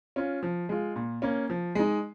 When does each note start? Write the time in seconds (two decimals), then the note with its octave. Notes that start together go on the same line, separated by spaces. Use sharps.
0.16 C#4 F4
0.43 F3
0.69 G#3 F4
0.96 A#2
1.22 A#3 C#4
1.50 F3
1.75 G#3 D#4